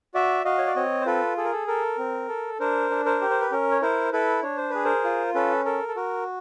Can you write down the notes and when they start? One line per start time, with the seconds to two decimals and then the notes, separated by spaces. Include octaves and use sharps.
0.15 F#4 D5 E5
0.45 F#4 D#5 F5
0.58 C#5
0.67 D5
0.76 C4 C#5 D#5
1.01 C5
1.06 F4 A4 B4
1.37 G#4 A4
1.45 A#4
1.52 A4
1.68 A4 A#4
1.98 C4
2.29 A4
2.60 D4 A#4 C5
2.90 D4
3.05 A#4 C5
3.21 G4
3.30 C5
3.41 B4
3.51 C#4 A#4
3.71 C#5
3.82 E4 A#4 C5
4.12 E4 A4 B4
4.43 D4 C#5
4.57 C5
4.70 G#4 B4
4.84 A#4 C5
5.04 F4
5.35 C#4 A4 B4
5.65 A4 A#4
5.88 A4
5.96 F#4 A#4